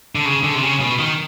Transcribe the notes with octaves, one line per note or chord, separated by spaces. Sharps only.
D3
C#3
D3
C3
C#3
B2
D#3